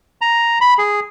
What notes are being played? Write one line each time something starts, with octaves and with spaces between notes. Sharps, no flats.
A#5
B5
G#4